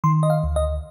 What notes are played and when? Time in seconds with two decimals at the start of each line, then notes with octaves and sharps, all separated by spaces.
0.04 D#3 C6
0.23 D#5
0.30 F5
0.43 D2
0.56 D#5